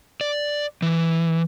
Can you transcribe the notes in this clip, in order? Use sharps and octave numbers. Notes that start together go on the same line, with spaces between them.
D5
E3